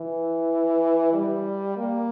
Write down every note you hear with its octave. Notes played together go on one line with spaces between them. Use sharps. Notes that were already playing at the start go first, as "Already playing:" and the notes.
Already playing: E3
G3
A#3